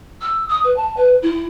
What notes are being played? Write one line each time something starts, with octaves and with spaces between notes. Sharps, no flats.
E6
D#6
B4
A5
B4
E4